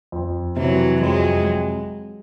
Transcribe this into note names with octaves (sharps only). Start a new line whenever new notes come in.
F2
C3 E3 F#3
F2 F#3 G#3